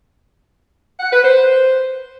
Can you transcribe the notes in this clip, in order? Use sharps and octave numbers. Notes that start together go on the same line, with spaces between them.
F#5
B4
C5